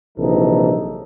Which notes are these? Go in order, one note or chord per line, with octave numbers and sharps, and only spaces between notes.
A#1 C3 E3 F#3 D#4 A4